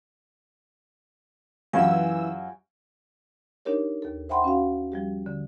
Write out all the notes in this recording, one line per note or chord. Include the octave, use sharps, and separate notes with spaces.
F#2 E3 F4 G4 F5 G#5 E6
D4 D#4 G4 A#4 C#5
D#2 A4
C5 E5 F#5 G5 B5 C6
C#4 F#4 F5
F3 G3 G4
D3